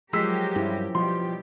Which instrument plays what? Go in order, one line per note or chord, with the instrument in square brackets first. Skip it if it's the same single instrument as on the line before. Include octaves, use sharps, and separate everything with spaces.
[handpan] F3 [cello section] F#3 G4 A#4 [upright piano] G#3 E6 B6
[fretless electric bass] G2 [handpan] C#4 E4 C5
[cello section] B2 G3 G4 [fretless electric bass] F3 [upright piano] C6